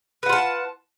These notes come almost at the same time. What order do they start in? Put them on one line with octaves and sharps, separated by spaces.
B4 F#5 F4 A5